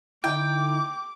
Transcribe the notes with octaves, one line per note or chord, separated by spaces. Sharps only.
D3 D#4 E4 G5 D6